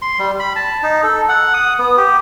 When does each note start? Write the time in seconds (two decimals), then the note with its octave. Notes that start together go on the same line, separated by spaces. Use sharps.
0.02 C6
0.19 G3
0.39 B5
0.56 A5
0.83 D#4
1.03 A4
1.29 F#5
1.54 D#6
1.78 B3
1.97 G4